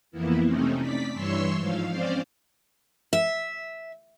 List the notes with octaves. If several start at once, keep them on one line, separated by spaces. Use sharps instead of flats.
F2 E3 A#3 B3 E4
C3 A3 C4 C#4 D#4
D5 B6
G2 E3 C#5 C6 C#6 E6
G#2 F3 F5
C4 C#4 C5 D5 F5
E5